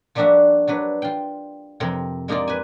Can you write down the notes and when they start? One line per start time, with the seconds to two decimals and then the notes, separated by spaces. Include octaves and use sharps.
0.15 F3 G3 A#3 D4 F#4 E5
0.67 F#3 D4 B4
1.02 F4 G5
1.80 F2 C3 C4 A#4
2.28 G#3 A#3 D#4 F4 D5
2.47 B4 G#5